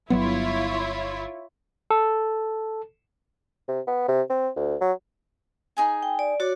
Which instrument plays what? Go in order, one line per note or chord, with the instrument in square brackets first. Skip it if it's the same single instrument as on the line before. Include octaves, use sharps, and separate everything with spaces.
[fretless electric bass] G1 F#3 B3 [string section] E4 F4 C#5
[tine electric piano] A4
[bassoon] C3
B3
C3
C4
D2
F#3
[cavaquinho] D#4 G#4 G#5
[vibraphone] G5
D5
[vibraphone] F#4 C#5 [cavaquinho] D5